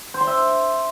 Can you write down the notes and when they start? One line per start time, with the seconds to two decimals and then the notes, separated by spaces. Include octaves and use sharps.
0.14 C5
0.21 C6
0.27 E5